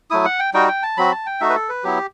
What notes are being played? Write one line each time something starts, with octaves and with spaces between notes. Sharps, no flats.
F#3 A3 E4 D#6
F#5
G5
G3 D#4 F#4 G5
G5
A5
F#3 C4 F#4 B5
A5
G5
A3 D#4 F#4 E5
B4
A4
B4
F#3 B3 E4 G4